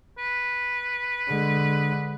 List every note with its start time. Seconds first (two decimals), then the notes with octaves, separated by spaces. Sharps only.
0.18 B4
1.28 D3 G#3